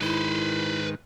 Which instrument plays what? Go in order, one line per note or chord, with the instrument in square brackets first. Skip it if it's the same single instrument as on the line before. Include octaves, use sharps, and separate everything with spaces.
[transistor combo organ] G#2 D#3 [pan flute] E4 [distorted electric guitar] B4 C5